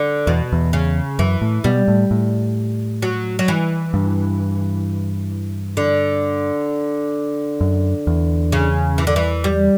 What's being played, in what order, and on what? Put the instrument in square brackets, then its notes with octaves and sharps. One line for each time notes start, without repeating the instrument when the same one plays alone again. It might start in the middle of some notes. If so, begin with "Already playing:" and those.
Already playing: [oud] D3
[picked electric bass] E2 [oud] B2
[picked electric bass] E2
[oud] C#3
[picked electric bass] F#2 [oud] E3
[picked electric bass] A2
[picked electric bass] B2 [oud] G3
[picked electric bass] A2
A2
[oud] F#3
F#3
E3
[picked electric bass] G2
[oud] D3
[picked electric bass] F#2
E2
[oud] C#3
E3
D3
E3
G3